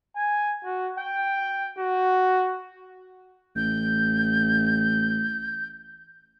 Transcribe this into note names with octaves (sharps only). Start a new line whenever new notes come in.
G#5
F#4
G5
F#4
A1 G6